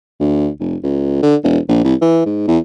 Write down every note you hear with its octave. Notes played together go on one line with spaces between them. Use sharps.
D2
F1
C#2
D3
E1
A#1
C2
E3
G#2
E2